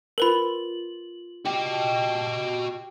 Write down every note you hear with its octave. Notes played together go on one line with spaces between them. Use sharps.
F4 A#4 B4 B5 F#7
F#4 G4 D#5